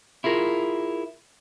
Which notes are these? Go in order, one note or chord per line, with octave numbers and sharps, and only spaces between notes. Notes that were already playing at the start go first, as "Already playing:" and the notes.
E4 F4 G#4 A#4